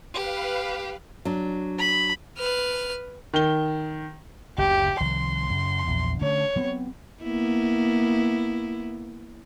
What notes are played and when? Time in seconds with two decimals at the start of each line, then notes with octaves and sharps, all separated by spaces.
0.14 G4 B4 F5
1.25 F#3 D4
1.79 B5
2.38 B4 F6
3.34 D#3 G7
4.58 F#1 D2 C#3 G4
5.01 C2 D#3 F3 C6
5.50 F#2 C#3
5.87 A#1 E2
6.21 D3 A3 C#4 C#5
6.56 F#3 B3 C4
7.23 A#3 B3 E4